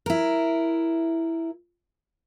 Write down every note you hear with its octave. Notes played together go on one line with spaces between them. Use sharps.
E4 A#4